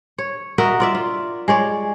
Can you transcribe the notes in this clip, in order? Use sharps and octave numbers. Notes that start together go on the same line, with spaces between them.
C#5
F#4 A#4 D#5 E5
F4 D5 E5
F4
G#3 C#5 D5